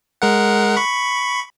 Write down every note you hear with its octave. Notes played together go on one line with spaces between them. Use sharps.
G#3 A#4 F#5
B5 C#6